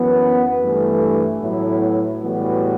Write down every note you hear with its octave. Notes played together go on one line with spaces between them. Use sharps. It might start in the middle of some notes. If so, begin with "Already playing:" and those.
Already playing: F#2 E3 B3
G2 E3 A3
A2 F#3 B3 E4
A2 E3 G3 B3 F#4